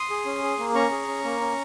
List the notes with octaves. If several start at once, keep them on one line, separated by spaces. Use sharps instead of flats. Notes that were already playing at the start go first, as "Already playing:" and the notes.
Already playing: C6 D#6
G#4
C#4
G#4
A#3
C#4 A#5 C#6
G#4
C#4
A#3
C#4